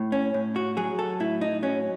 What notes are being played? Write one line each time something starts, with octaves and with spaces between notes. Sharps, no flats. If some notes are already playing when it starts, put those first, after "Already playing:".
Already playing: A2
C#4
A2
F#4
F#3 G#4
A4
A2 E4
D#4
F#3 C#4